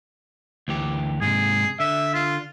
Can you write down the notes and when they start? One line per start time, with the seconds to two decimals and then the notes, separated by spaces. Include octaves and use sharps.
0.68 D2 E3 G4
1.21 G#2 C3 G#4
1.80 D3 E5
2.14 F4